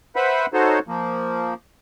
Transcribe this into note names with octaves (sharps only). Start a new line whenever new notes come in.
B4 C5 E5 F#5 B5
D#4 F#4 A4 C5 C#5
F3 A#3